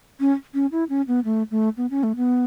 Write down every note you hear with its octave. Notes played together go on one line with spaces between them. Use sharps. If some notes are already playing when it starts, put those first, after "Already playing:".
C#4
C#4
E4
C#4
B3
A3
A3
B3
C#4
A3
B3